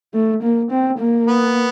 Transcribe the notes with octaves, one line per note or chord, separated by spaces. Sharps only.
A3
A#3
C4
A#3
B3